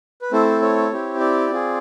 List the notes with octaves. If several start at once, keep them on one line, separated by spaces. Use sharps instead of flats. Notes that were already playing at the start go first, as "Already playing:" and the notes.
B4
A3 C4 E4 A4 C5
C#5
C4 E4 G4
D5
C4 F4 G#4